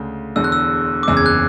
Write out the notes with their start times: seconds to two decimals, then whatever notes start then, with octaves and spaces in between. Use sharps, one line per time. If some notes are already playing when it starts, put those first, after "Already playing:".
Already playing: D2 C#3 G#3
0.36 E1 E2 D3 E6
0.44 F#6
0.52 E6
1.03 D6
1.08 F#1 E2 C#3 E6
1.17 G#6
1.26 F#6